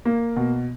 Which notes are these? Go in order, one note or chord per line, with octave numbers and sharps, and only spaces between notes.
A#3
B2